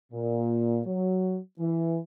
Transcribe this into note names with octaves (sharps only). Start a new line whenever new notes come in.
A#2
F#3
E3